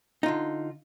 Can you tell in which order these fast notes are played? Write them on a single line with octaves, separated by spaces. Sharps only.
D#4 F4 D3